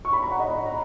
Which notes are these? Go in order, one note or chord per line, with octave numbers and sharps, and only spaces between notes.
C#6
B5
A#5
F#5
D#5
A#5